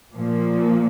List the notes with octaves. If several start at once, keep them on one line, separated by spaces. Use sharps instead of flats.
A#2 F3 A#3